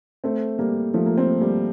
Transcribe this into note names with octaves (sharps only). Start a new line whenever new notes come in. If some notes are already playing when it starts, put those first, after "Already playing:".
A3 C4
G3 A#3
F3 A3
A#3
A3 C4
G3 A#3